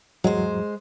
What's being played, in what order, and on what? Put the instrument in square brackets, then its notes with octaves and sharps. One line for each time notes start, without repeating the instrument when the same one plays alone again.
[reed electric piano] E2 G#2 F#3 [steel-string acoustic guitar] G#3 C5